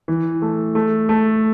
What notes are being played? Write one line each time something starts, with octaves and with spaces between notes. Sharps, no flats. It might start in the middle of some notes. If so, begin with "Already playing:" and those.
E3
A3
A3
A3